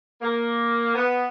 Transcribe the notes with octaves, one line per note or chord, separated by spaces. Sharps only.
A#3
B3